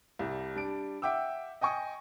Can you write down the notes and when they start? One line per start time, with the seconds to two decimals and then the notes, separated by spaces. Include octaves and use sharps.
0.19 C2 G3
0.55 G3 D4 D7
1.02 E5 F#5 G5 D6 E6
1.61 D#5 G5 G#5 C#6 D#6